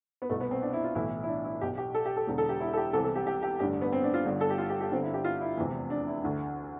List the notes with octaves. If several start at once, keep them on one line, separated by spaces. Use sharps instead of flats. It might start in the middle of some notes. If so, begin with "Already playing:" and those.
B3
C2 B2 A3
B3
C4
D4
E4
F4
B1 A2 E3 E4
E4
D4
E4
B1 B2 G4
G4
A4
G4
A4
E1 E2 D3
A4
G4
E4
A4
G4
C2 C3 E3 A4
A4
G4
G4
G4
A1 G2 D3 G4
B3
C4
D4
F4
G1 G2 D3
A4
G4
F4
G4
G4
G1 G2 D3 C4
E4
G4
F4
E4
F1 E2 C3 E3
D4
E4
D2 D3